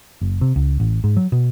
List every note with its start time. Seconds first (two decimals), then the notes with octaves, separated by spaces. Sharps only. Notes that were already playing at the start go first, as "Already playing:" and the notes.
0.21 F#1
0.41 C3
0.56 C#2
0.80 A1
1.04 G#2
1.17 F#3
1.32 B2